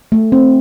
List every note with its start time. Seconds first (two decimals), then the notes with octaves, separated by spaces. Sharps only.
0.12 A3
0.32 C4